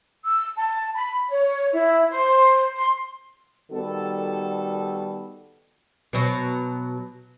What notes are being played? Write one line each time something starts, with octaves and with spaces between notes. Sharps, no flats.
E6
A5
B5
C#5
E4
C5
C6
D#3 G3 B3 F#4 A4
B2 F#3